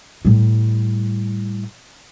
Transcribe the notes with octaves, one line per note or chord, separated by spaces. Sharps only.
A2 G3